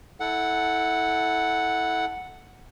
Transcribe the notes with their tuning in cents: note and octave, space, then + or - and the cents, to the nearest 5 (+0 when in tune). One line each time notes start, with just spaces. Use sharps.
E4 -20 A4 +0 F#5 +0